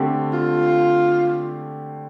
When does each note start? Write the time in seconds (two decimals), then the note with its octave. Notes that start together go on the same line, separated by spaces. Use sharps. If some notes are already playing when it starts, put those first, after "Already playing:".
Already playing: D3 A3 C4 G4
0.33 F4